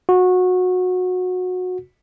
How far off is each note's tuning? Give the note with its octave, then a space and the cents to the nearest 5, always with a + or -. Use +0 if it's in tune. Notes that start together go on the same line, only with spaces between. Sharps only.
F#4 -20